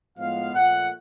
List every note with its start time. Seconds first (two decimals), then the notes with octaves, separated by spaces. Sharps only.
0.17 A2 F3 G#3 B3 F5
0.54 A#2 F3 A3 F#5